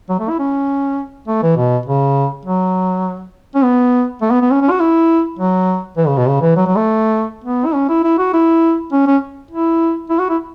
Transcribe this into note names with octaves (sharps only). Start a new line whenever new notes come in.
F#3
A3
E4
C#4
A3
E3
B2
C#3
F#3
C#4
B3
A3
B3
B3
C#4
C#4
F#4
E4
F#3
E3
C#3
B2
C#3
E3
F#3
F#3
A3
B3
E4
C#4
E4
E4
F#4
E4
C#4
C#4
E4
E4
F#4
E4